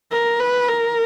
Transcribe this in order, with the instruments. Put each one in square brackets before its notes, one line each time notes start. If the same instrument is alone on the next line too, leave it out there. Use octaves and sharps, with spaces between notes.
[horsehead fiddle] A#4
B4
A#4